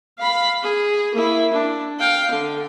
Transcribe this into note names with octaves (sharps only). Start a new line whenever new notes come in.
F5 B5
G#4
A#3 E4
D4
F5 G5
D3